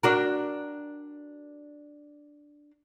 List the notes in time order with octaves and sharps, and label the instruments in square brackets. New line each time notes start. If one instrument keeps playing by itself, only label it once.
[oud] D4 F#4 A#4